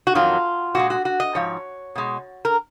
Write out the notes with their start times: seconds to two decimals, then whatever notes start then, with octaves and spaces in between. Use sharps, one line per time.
0.07 F#4
0.15 F2 D#3 F#3 F4
0.75 A#2 F3 G#3 F#4
0.90 F#4
1.05 F#4
1.20 D#5
1.35 G#2 F3 C#5
1.95 B2 G#3
2.45 A#4